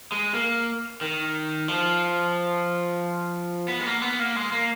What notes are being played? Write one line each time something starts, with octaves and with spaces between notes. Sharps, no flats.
G#3
A#3
D#3
F3
B3
G#3
A#3
B3
A#3
G#3
A#3